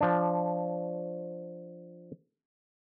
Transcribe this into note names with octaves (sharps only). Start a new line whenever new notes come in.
F3 D4